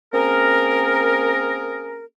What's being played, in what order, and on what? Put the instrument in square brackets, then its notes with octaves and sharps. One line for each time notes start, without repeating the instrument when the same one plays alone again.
[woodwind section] A#3 C4 C#4 G#4 A#4